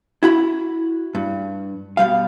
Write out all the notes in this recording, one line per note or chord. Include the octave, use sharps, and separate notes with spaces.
E4 F#4 B5
G2
B2 D#3 G3 F5